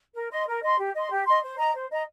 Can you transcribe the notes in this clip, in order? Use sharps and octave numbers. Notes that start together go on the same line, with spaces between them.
A#4
D#5 C6
A#4
D#5 C6
G4
D#5 C6
G4
D#5 C6
C5
D#5 A#5
C5
D#5 A#5